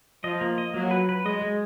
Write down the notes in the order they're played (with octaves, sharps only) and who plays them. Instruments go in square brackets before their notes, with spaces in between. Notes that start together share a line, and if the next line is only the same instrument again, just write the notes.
[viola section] F3 [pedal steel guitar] D#5
[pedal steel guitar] A#3
D#5
[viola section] F#3 [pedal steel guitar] A#3
[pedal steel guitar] B4
B4
[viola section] G#3 [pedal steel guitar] D#5
[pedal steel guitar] G#3